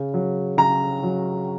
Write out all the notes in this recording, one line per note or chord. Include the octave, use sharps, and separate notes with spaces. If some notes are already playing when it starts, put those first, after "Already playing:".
Already playing: C#3
F#3
C#3 A#5
F#3